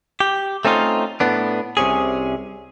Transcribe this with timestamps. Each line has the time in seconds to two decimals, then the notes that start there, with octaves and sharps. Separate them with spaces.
0.20 G4
0.65 A3 C4 C#4 D#4 F4
1.20 A2 B3 D4
1.77 C2 C3 C#4 G#4